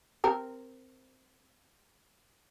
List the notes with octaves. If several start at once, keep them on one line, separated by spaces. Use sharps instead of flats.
C4 A#4